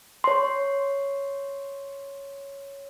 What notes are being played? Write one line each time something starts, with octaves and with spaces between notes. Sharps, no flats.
C#5 C6